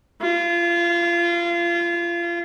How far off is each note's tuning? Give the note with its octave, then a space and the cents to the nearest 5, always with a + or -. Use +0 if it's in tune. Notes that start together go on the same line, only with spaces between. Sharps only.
F4 -30